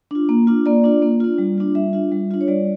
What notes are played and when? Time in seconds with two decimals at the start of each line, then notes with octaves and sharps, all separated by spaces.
0.11 D4 F4
0.29 A#3
0.47 D4 F4
0.66 A#3 D5
0.84 D4 F4
1.02 A#3
1.20 D4 F4
1.38 G3
1.58 D4 F4
1.75 G3 E5
1.93 D4 F4
2.12 G3
2.31 D4 F4
2.41 C#5
2.48 G3 D5